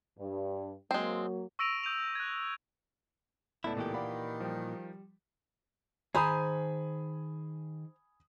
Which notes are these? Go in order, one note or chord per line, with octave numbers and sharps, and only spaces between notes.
G2
F#3 G#3 A#3 C4
C#6 E6 A#6 D7 D#7 F7
D#6 G6 D#7 F7
F#6 G#6
C#2 A2 B3 E4 A4 D5 A5
A#2 D#3 E3 G4
D5 F5 F#5 B5
F3 G3 G5
D#3 G#4 C5 G#5 A#5 B5 D#6